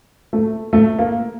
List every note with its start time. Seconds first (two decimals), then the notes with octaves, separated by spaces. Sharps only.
0.33 A3
0.73 A3
0.98 A#3